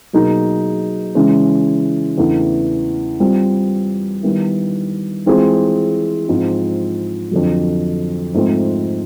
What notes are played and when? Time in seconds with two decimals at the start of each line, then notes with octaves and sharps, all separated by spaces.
0.13 B2 F#3 A#3 D#4 G#4
1.15 C#3 E3 G#3 C#4
2.18 E2 C#3 E3 A3 D4
3.20 G3 C4 F4
4.23 D#3 G3 B3 E4
5.26 E3 G#3 C4 F4 G#4
6.28 G#2 F3 G#3 C4 F4
7.31 F2 D3 F#3
8.34 G#2 F3 A3 C4